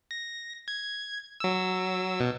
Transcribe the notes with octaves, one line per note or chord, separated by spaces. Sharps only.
A#6
G#6
F#3 E6
B2